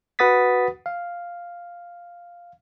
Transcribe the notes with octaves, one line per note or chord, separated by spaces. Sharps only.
F#4 B4 F#5 D#6 A6 B6
F5